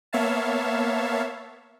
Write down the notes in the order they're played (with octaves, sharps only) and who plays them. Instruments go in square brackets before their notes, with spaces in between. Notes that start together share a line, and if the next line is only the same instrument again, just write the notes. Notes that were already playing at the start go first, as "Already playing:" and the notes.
[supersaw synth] A#3 B3 C#5 E5 F5 A5